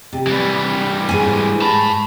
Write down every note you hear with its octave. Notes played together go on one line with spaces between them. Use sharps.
C3
E3 G3
G#2 G#5
A5 B5